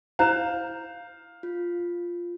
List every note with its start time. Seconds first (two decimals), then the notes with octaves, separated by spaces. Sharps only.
0.19 E4 C5 F5 A#5 G6 E7
1.43 F4